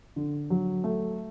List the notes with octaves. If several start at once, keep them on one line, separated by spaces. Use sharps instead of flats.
D3
F#3
A3